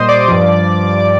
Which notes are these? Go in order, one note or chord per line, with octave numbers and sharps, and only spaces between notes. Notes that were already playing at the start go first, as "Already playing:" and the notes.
Already playing: A#2 G3 C5 D#5 C6 D#6
D5 D6
G2 F3